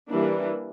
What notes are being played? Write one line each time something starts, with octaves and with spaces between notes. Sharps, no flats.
E3 G3 A#3 D4